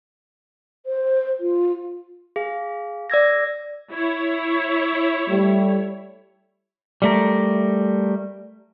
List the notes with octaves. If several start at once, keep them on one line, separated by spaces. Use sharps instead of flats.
C5
F4
G#4 F5
D5 E6 G#6 A#6
E4 C#5
G3 A3
G3 A3 A#4